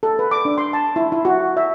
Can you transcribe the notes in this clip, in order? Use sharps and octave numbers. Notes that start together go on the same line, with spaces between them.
A4
B4
D6
D4
C6
A5
E4
E4
F#4
E5